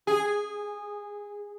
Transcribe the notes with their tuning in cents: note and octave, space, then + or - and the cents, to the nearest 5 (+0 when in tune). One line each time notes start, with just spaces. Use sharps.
G#4 -15